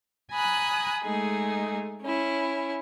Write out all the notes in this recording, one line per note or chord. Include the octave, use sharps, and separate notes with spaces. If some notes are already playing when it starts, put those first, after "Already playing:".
G#5 A#5 B5 D#6 F#6
G#3 A3 D#4 G#4
C#4 E4